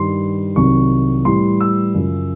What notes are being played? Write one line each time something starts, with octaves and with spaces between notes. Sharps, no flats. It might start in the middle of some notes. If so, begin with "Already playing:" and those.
Already playing: G2 D#3 G3 C6
C2 C3 D#3 F#3 C#6
A2 E3 G3 C6
E6
F#2 C#3 F3